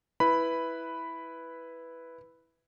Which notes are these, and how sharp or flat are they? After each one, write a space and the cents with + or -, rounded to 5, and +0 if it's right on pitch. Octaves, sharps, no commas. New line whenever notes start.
E4 +0 B4 +0 B5 +0